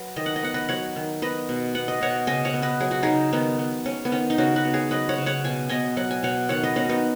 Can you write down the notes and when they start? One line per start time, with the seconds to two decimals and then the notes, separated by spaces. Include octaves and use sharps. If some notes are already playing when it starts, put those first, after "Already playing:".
Already playing: F#3 F#4 B4
0.16 D#3 D#5
0.26 F#5
0.36 D#5
0.43 B3 F#5
0.54 B4 D#5
0.69 F#3 C#5 F#5
0.96 D#3
1.22 B3 B4 D#5
1.49 B2
1.75 B3 F#5
1.88 D#5
2.01 B2 C#5 F#5
2.27 C#3 D#5 G#5
2.45 C#5 F#5
2.54 B3
2.62 B4 D#5
2.80 F#3 G#4
2.91 F#4
3.03 C#3 D#4 G#4
3.33 D#3 B3 D#4
3.59 B3
3.86 G#3 C#4
4.05 B3
4.12 D#3 C#4
4.30 D#4
4.38 C#3 C#4 F#4
4.56 F#4 B4
4.65 B3
4.73 G#4 C#5
4.91 F#3 B4 D#5
5.09 C#5 F#5
5.18 C#3
5.26 C#5 F#5
5.44 B2 G#5
5.69 B3 D#5 G#5
5.97 F#3 F#5
6.11 G#5
6.23 B2 C#5 F#5
6.49 D#3 C#5 F#5
6.63 B4 D#5
6.76 B3 C#4 F#4
6.89 B3 D#4